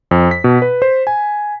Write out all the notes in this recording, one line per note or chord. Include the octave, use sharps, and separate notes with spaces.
F2
B6
B2
B4
C5
G#5